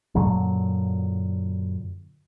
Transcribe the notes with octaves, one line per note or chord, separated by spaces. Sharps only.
F#2 A#2 D3 F#3